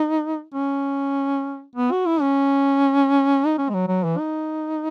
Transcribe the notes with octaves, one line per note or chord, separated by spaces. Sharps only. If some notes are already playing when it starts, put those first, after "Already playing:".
Already playing: D#4
C#4
B3
F#4
E4
C#4
D#4
C#4
G#3
F#3
F#3
E3
D#4